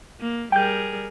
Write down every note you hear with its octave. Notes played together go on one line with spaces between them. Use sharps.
A#3
G3 G#4 A#4 G5 G6